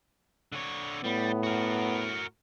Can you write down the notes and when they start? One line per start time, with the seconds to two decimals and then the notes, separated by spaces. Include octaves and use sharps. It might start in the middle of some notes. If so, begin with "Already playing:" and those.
0.52 D3 C#5
1.04 A2 G3 B3
1.43 F#4 A#4